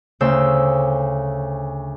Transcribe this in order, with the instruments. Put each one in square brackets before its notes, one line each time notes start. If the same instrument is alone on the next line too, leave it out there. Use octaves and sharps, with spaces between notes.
[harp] D2 C#3 C5 E6